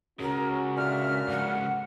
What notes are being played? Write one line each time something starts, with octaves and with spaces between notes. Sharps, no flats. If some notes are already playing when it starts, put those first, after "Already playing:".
C#3 G#3 C#4 F#4 A#4
A#2 D3 E5 F6
G#2 C#3 F#5